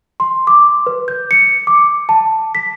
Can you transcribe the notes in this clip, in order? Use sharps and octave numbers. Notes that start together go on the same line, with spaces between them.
C6
D6
B4
G6
C#7
D6
A5
B6